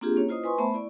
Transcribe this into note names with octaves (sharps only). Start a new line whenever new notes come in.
A#3 C4 D4 F4 G4 G#4
A#3 C#4 C#5
E4 F4 C5 D#5 D#6
B4 G#5 C6 C#6
A3 B3 C5 E5 A5 B5
E4 D5 C#6